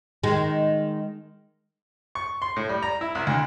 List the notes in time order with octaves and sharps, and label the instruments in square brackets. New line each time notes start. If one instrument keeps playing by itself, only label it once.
[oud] D#3 G#3
[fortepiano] C#6
C6
A2
G3
A#5
E4
C2
D2